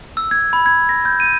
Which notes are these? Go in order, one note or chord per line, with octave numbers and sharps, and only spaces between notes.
E6
G#6
B5
G#6
A#6
G6
D#7